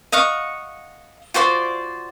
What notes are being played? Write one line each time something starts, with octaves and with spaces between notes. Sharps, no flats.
D#5 F5 F#5 C#6
F4 F#4 C5 D5